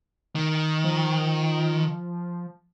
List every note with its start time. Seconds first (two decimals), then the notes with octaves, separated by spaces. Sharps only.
0.36 D#3
0.84 F3